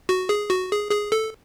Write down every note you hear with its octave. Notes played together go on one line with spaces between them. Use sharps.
F#4
G#4
F#4
G#4
G#4
A4